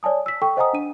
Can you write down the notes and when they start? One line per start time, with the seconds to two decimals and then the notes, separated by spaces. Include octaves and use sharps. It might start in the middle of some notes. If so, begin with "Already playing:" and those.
0.03 C#5 D5 G#5 A5 D#6
0.26 E6 B6
0.42 A4 G5 C#6
0.57 C5 D#5 F#5 G#5 A#5 D#6
0.73 D4 D#7